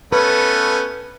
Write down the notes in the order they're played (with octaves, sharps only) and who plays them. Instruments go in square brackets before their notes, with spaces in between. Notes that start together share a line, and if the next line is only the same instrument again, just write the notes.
[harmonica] A3 B3 C#4 [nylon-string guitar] B4